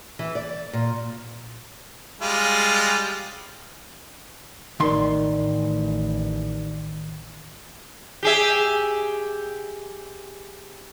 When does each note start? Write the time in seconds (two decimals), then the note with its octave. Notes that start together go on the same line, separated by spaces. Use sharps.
0.19 E3
0.35 D5
0.73 A#2
2.21 G3 G#3 F4
4.80 A1 D#3 D#4 A#4 D5 C6
8.23 G4 G#4 E5